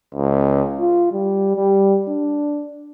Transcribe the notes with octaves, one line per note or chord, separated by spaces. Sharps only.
C#2
F4
G3
G3
D4